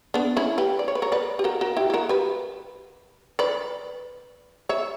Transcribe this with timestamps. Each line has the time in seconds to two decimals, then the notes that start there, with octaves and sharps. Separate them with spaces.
0.14 B3 D4
0.37 C#4 E4
0.58 G4 B4
0.79 D5
0.88 C#5
0.95 B4
1.02 A#4 C#5
1.12 B4 D5
1.39 G4
1.44 F#4 A#4
1.61 F#4 A#4
1.77 E4 G4
1.90 G4
1.94 F#4 A#4
2.09 G4 B4
3.39 B4 D5
4.69 C#5 E5